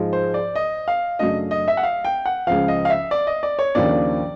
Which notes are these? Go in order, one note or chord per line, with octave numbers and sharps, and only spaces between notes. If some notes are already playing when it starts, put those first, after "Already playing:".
Already playing: G#2 F3 G#3
C5
D5
D#5
F5
F#2 C#3 F#3 A3 D4 D#5
D#5
E5
F#5
F5
G5
F#5
C#2 C#3 F3 F5
D#5
F5
E5
D5
D#5
D5
C#5
D#2 C#3 F3 A#3 D4 D5